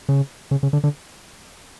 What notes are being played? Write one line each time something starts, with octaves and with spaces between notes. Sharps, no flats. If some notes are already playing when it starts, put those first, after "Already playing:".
C#3
C#3
C#3
D3
D3